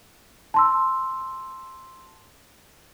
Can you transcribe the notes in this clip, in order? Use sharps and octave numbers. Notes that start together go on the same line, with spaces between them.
A5 C6 E6